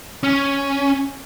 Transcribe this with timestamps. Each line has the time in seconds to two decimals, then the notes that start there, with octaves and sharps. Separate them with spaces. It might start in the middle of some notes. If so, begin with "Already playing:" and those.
0.23 C#4